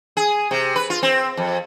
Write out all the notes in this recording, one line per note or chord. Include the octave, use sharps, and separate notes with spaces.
G#4
C3
B4
F4
C4
F2